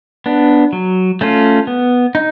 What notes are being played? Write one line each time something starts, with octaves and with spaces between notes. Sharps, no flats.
B3 D4
F#3
A3 C#4 F4
B3
D#4